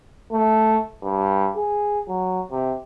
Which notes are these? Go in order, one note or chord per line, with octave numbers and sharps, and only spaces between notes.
A3
G2
G#4
F#3
C3